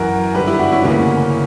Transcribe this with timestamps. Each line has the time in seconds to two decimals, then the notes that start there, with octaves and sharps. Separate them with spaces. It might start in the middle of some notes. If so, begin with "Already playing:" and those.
Already playing: F#2 E3 F#4 A#4
0.34 G2 D3 G4 B4
0.47 E4 G4
0.59 D4 F#4
0.72 C#4 E4
0.84 D2 C#3 E3 A#3 C#4